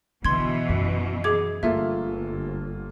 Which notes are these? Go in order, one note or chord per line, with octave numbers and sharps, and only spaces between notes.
B2 D3 E3 C6 G#6
F#2
G#4 D6 G#6
G1 A3 A#3 F4 A4 E5